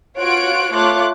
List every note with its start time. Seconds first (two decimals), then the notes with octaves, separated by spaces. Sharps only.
0.19 F4 F#4 C#5 F#6 D7
0.73 A3 F4 C#5 D6 F#6